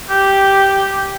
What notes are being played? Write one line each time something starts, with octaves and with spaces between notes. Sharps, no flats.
G4